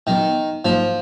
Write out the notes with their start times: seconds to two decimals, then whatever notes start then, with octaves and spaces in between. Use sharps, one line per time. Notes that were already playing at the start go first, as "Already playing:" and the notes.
0.06 A#2 D#3 F#3 B3
0.65 G#2 F3 F#3 A#3 D#4